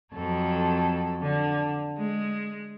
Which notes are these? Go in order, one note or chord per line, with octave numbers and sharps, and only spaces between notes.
F2 F#3 A4
D3
G#3